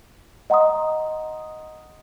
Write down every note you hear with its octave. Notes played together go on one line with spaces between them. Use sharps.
D#5 F#5 A#5 C6 D#6